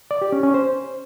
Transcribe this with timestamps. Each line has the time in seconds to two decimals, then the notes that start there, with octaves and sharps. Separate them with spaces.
0.11 D5
0.22 G4
0.32 C#4
0.43 C#4
0.54 C5